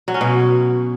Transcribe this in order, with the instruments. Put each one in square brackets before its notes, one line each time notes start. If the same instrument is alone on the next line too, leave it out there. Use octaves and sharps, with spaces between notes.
[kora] F#3
C#4
B2